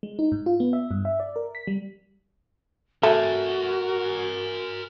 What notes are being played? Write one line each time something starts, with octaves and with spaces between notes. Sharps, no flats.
G#3
D#4
G#2
F4
B3
E5
G2
E5
D5
A#4
B6
G3
A3 F#4 A#4 G#5